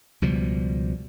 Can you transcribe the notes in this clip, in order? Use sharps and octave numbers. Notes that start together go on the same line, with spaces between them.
C#2 B2 F3 G3